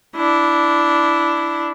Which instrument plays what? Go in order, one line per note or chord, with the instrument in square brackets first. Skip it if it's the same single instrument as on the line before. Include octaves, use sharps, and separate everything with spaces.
[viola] D4 E4